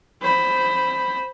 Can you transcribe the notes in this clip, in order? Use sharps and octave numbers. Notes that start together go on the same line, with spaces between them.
C5 B5